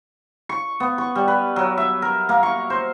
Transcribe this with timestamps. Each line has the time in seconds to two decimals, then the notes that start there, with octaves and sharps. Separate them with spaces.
0.49 C#6
0.80 B3
0.98 C#6
1.15 G3
1.28 B4
1.56 F#3
1.77 E5
2.02 A#4
2.29 A#3
2.43 C#6
2.70 C5